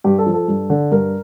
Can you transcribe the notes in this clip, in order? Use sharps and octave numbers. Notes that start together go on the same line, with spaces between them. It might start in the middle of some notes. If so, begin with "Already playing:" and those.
G2 G4
A4
F3
A4
G2
D3
G2 A#4